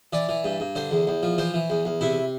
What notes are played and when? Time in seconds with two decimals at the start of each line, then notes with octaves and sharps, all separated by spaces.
0.13 E3 D5
0.29 E3
0.44 G2
0.60 G2
0.75 D3 C5
0.91 E2
1.07 E2
1.23 F3
1.38 E3 C5
1.54 E3
1.70 E2
1.85 E2
2.01 C3 E4